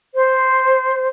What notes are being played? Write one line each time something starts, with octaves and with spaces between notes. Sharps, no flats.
C5